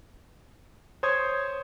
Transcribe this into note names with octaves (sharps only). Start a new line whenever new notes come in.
C5 C#5 D#6 G#6